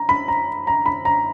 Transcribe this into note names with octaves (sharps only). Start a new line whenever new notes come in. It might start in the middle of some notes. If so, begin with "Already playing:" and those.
Already playing: A#5
B5
A#5
A#5
B5
A#5